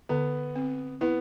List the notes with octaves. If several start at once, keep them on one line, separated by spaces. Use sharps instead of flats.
D3 B3
C4
B3 E4